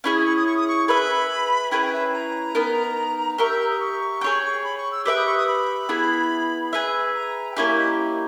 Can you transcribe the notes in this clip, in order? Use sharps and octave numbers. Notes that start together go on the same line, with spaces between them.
C#4 E4 G#4 C#6
D#6
C#6
D#6
C#6
D#6
C#6
G#4 B4 E5 B5
C#4 E4 G#4 B4 G5
G5
E5
A#5
B3 D#4 A#4
G4 A#4 E5 C#6
E6
E6
D#6
C#6
G#4 C#5 G5
B5
C#6
E6
G4 B4 E5 G5 E6
D#6
C#6
D#6
B5
B3 E4 G#4
G#4 B4 E5
A#5
G5
A#3 C#4 E4 G4 G#5
E5
D#5